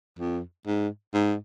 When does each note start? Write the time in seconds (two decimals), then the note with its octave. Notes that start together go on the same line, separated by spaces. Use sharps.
0.19 F2
0.67 G#2
1.13 G#2